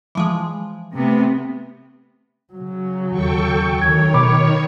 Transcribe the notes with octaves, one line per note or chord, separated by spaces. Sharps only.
E3 F3 G#3
C3 A3 B3
C#3 F#3
D#2 A4 G5 C#6
D2 D#3 C#5 G#6
B2 B5 D6